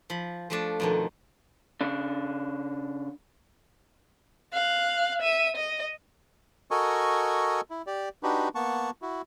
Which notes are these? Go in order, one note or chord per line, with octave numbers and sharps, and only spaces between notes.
F3 B5
F3 A3 D4
F2 B2 D#3
C#3 D4
F5 F#6
E5 D#7
D#5
F#4 A4 A#4 D#5 G#5 C#6
E4
G4 D5
D4 D#4 F#4 G4 B4
A#3 B3 F#5 A5 C#6
E4 F#4